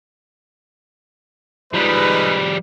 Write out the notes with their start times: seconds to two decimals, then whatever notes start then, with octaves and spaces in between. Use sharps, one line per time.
1.73 F3 G3 G#3 D#4 B4